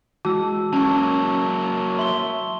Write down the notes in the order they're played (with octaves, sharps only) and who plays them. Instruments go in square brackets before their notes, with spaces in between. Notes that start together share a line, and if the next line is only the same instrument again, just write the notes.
[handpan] E3 G#3 [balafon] F#4 [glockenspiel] A5 E6
[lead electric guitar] F#3 A#3 [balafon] C#4 [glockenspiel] A5 C#6
[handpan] E5 [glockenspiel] C6 G7